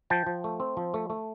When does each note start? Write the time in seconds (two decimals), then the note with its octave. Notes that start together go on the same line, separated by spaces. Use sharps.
0.10 F3 G5 A5
0.26 F3
0.44 A3
0.60 C4
0.77 F3
0.94 A3
1.10 A3